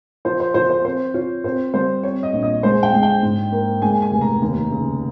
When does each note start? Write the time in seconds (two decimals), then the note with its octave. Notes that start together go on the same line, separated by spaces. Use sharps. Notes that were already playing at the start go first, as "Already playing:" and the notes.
0.25 F3 C5
0.40 C5
0.54 F3 C5
0.70 C5
0.85 C4 C5
1.14 F4 C#5
1.44 C4 C5
1.74 G3 C5
2.03 C4 C#5
2.23 D#5
2.33 A#1
2.43 D#5
2.63 G#3 C5
2.83 G5
2.93 G#3
3.03 G5
3.23 G#2
3.52 A#3
3.82 G#3 G#5
4.02 G#5
4.12 F1
4.21 A#5
4.42 D#2
4.71 C#3